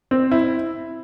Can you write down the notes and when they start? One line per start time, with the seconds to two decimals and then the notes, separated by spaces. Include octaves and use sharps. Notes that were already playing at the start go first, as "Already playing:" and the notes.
0.11 C4
0.31 E4